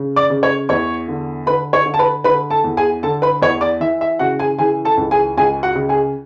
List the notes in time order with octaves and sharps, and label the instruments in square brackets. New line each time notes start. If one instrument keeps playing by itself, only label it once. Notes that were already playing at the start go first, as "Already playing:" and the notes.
Already playing: [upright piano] C#3
D5 D6
C#3
C#5 C#6
E2 C#5 C#6
D3
D3 B4 B5
C#5 C#6
D3
A5
B4 B5
D3 B4 B5
A4 A5
E2
G#4 G#5
D3 A4 A5
B4 B5
E2 C#5 C#6
D5 D6
E3 E5
E5
C#3 F#4 F#5
G#4 G#5
E3 G#4 G#5
A4 A5
C#2
G#4 G#5
C#2 G#4 G#5
F#4 F#5
C#3
G#4 G#5